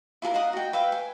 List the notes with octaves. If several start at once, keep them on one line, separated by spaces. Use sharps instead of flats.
E4 F4 G#4 A#4
D#4 F5 F#5 D#6
F#4 G5
B4 E5 F5 G5
G#5